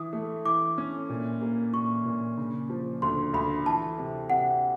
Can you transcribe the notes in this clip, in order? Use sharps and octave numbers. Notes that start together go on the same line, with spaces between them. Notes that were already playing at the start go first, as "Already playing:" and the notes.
Already playing: E3 D#6
A3
E3 D6
C#4
A#2
A#3
A#2 C#6
A#2
C#3
F3
D2 C6
D2 B5
E3 A5
C3
C3 F#5